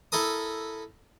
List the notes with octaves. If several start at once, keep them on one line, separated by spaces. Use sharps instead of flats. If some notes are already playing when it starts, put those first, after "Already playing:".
E4 A4 A#4 D#6